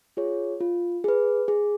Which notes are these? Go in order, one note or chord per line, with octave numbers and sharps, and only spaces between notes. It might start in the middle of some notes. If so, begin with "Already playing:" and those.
F4 G#4 C#5
F4
G#4 B4
G#4